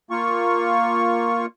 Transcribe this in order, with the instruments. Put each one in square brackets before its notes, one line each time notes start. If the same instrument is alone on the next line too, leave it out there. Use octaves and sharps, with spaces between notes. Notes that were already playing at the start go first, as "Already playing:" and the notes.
[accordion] A#3 F4 C#6